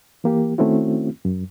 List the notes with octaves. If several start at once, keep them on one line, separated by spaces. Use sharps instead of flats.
E3 A#3 G4
D#3 A3 C4 C#4 E4 F#4
F#2